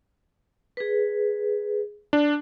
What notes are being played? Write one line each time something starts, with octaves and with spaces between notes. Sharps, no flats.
G#4 B4
D4